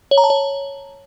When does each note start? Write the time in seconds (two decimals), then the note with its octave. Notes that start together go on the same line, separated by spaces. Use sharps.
0.11 C#5
0.18 A#5
0.24 A5
0.30 C#5